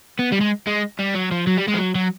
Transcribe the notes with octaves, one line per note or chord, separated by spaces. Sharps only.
B3
G3
G#3
G#3
G3
F#3
F3
F#3
G3
G#3
F3
F#3
F#3